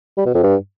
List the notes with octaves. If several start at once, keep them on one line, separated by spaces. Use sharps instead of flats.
G3
B2
F2
G2